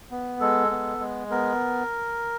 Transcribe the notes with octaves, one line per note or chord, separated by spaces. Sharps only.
B3
G#3 A4
B3
G#3
B3 A#4